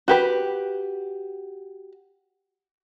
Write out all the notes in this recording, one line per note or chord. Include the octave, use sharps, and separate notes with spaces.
F#4 G4 B4